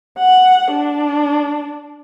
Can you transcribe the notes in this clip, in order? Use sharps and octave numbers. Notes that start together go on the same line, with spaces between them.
F#5
D4